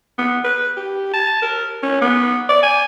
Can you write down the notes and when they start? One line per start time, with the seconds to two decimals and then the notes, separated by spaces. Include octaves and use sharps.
0.18 B3
0.44 B4
0.77 G4
1.14 A5
1.42 A#4
1.83 C#4
2.01 B3
2.49 D5
2.63 G#5